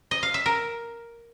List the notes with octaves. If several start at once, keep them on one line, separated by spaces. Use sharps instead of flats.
D#5
F5
E5
A#4